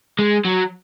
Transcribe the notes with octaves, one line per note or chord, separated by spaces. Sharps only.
G#3
F#3